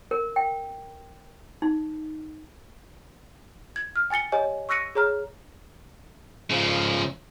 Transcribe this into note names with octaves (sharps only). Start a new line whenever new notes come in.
A#4
G5
D#4
G#6
F6
G5 G#5 A6 C#7 G7
G4 C#5 D#5 G#5
C#6 E6 F#6 A#6 C#7 D#7
G#4 C#5 A#5 F6
C#3 F3